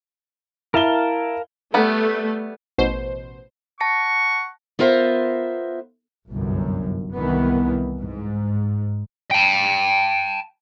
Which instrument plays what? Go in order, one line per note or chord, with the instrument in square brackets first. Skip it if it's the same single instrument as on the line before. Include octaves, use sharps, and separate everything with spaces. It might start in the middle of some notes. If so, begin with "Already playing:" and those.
[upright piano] E4 G7 [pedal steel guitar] A#4 F5 A5
[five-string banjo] G3 B3 [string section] A3
[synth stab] A1 B2 C5
[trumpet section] F#5 C#6 [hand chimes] A5 A#6 C#7
[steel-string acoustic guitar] B3 F4 A#4 C5 E5
[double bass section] G1 C2 F#2
C2 D#3 E3 B3
G#2
[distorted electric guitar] G5 A5